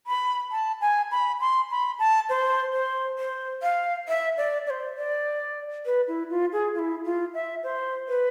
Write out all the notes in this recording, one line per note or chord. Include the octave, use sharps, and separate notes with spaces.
B5
A5
G#5
B5
C6
B5
A5
C5
C5
C5
F5
E5
D5
D5
C5
D5
B4
E4
F4
G#4
F4
E4
F4
E5
C5
B4